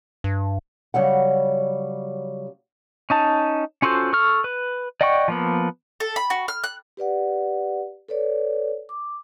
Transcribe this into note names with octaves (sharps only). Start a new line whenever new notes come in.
G2
C#3 F#3 G3 F#5
C#4 D#4 A5
C#4 F4 F#4 A4 C5
A4 C#6 F6
B4
D5 D#5 F#5 G5 C#6
F3 A#3 B3
A4
B5
F#4
F6
F#6
G4 B4 D5 F#5
A4 B4 C#5 D5
D6